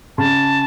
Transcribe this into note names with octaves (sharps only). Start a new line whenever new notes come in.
C#3 A5